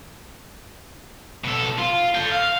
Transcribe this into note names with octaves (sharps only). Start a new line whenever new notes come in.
B2 A4
F4
A4 G5
F5